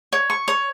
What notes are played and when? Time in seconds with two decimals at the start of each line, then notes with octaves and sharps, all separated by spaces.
0.12 C#5
0.30 C#6
0.48 C#5